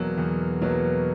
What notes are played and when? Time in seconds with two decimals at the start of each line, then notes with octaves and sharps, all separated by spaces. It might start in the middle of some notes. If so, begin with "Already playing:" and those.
Already playing: E2 B2 F#3 A#3
0.18 E2
0.62 B2 F#3 A#3